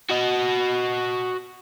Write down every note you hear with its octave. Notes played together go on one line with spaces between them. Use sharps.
F#4 D#5